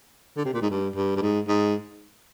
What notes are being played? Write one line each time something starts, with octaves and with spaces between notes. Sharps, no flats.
D3
C3
A#2
G#2
G2
G2
G2
G#2
G#2